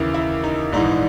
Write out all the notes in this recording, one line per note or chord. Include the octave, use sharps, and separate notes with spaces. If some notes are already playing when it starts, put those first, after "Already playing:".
Already playing: D#2 C#3 E3 E4
E4
D#4
A#1 G#2 E3 D#4